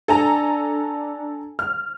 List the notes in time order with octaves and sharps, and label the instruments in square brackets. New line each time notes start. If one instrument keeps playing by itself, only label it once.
[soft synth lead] D4 [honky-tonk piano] A4 G#5 A#5
[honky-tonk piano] F6